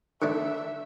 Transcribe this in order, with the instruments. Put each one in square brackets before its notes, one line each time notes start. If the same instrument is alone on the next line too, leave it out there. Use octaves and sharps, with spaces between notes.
[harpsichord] D3 A3 D4 [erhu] E5